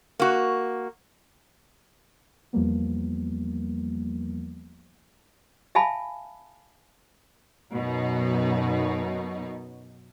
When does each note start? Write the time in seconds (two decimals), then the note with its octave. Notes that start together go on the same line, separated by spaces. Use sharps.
0.19 A#3 F#4
2.53 E2 F3 G3 A#3 B3
5.75 E5 F5 G#5 A5 B5
7.73 F#2 B2 D#4